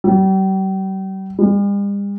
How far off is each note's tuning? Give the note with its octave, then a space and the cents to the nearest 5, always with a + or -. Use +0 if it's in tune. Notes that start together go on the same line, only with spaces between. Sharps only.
G3 -40
G3 +45